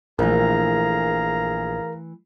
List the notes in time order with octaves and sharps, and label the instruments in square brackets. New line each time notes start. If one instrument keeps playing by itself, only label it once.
[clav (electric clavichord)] A#1 [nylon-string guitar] E3 A3 [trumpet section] G#4 F5 A#5 [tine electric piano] A#4